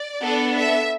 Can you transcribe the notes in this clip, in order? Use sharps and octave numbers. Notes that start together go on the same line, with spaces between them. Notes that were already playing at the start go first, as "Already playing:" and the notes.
Already playing: D5
B3 D4 A4
E5